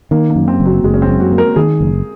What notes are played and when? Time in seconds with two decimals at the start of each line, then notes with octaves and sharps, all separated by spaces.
0.11 D#3 A#3
0.30 A#3
0.35 F#2
0.48 C4
0.60 F#1
0.66 F#3
0.84 F#1 G#3
0.94 C#4
1.02 C4
1.08 F#2
1.20 F#4
1.32 A#3
1.38 A#4
1.56 D#3 G#4
1.80 F#1